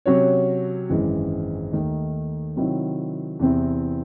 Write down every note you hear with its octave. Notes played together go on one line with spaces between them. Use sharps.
C3 F#3 C#4 F#4 C#5
G#1 F#2 E3 G#3
D#2 D#3 A3 D#4
C3 D#3 F#3 C4 E4
E2 C3 E3 C4 E4